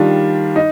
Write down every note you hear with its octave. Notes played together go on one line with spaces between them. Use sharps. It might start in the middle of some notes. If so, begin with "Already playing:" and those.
Already playing: D#3 G3 D4 F4
D#4